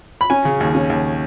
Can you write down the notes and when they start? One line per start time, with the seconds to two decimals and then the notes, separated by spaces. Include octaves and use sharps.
0.21 B5
0.30 C#4 G#5
0.45 C#3
0.60 D#2
0.75 C#4
0.90 D#2